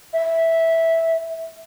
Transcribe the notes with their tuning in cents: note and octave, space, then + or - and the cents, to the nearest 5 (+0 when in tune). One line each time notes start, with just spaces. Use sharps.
E5 -5